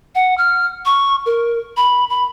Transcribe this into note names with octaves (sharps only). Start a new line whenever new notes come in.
F#5
F6
C#6
A#4
B5
B5